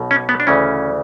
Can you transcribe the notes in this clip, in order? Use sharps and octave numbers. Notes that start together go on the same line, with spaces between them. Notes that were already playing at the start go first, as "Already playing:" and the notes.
Already playing: B1 B2
C#4
B3
D4
D2 C#3 E3 C#4